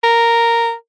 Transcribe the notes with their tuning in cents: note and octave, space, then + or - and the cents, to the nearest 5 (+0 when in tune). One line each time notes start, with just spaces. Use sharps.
A#4 -5